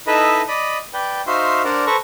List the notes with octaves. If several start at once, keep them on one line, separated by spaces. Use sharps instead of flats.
D#4 E4 A4 B4 D#5 E5
D5 D#5 B5 D#6
B4 D5 G5
D#4 F#4 C5 E5 F5 C6
D4 A#4 C5 D5 F#5
A4 B4 C5 A#5 C#6